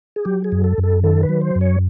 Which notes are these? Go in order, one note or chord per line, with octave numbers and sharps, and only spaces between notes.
G#4
F#3 G4
G#4
F#2
A4
F#2
A4
D#3 A4
B4
F#3
C5
F#2
C#5